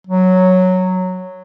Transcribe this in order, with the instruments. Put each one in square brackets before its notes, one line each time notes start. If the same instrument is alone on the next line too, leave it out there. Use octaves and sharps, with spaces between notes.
[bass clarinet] F#3